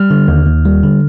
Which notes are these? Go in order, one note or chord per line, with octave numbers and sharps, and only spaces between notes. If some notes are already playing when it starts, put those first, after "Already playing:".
Already playing: G3 F6
D3
D#2
D#2
G3
D3